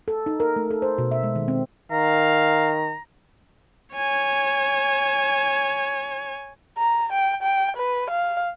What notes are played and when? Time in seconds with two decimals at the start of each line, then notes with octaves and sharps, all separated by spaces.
0.08 A4
0.26 D#4
0.40 A#4
0.56 A3
0.70 A4
0.82 C5
0.98 B2
1.11 E5
1.23 G#3
1.36 D#3
1.48 C4
1.92 D#3 F5 A#5
3.96 C#5 G#5
6.78 A#5
7.12 G5
7.42 G5
7.77 B4
8.10 F5